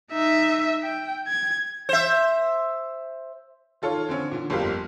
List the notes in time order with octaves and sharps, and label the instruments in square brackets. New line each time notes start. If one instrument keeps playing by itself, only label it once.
[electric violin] D#4 E5
G5
G#6
[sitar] C5 E5
[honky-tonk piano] D#3 F4 A4 C#5
D3 C4 C#4
A#2 D3
G1 F2 A#3 F4 G4